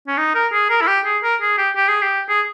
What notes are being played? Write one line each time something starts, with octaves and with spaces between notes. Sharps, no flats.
C#4
D#4
A#4
G#4
A#4
E4
G4
G#4
A#4
G#4
G4
G4
G#4
G4
G#4